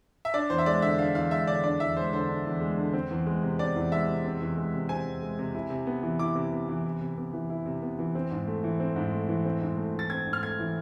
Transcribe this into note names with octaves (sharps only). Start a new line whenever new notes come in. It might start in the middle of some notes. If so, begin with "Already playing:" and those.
E5
D4 D5
E2 C5
E5
G#3 D5
D3 E5
D4 F5
E2 F5
G#3 E5
D3 D5
D4 D5
E2 E5
G#3 C5
D3 C5
D4
E2
G#3
D3
C4
E2
G#3
C3
C4 D5
E2
G#3 E5
C3
C4
E2
G#3
C3
C4 G#5
E2
G#3
C3
E4
C3
B3
E3
E4 D6
C3
B3
E3
E4
C3
B3
E3
E4
C3
B3
E3
C4
G#2
A3
E3
C4
G#2
A3
E3
C4
G#2
A3
E3 A6
C4 G#6
G#2
F6
A3 G#6
E3